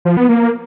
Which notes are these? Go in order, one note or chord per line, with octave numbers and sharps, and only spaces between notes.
F3
B3
A#3